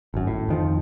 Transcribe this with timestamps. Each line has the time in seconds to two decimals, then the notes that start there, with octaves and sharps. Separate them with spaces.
0.14 G#1 F#2
0.27 A2
0.48 F2 D#3 F3